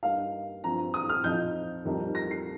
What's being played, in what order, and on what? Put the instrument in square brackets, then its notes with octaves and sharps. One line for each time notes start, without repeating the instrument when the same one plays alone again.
[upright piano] G2 G3 A#3 D#4 F5
G2 F3 C4 A#5
D#6
F6
F2 F3 D#4 G6
F2 D#3 G3 A#3 D#4
A#6
C7